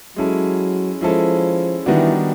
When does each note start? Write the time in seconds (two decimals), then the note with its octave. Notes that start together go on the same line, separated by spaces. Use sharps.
0.16 F#3 G#3 C#4 E4 A4
1.01 F3 G#3 C#4 E4 A4
1.86 D#3 E3 G3 B3 D4 F#4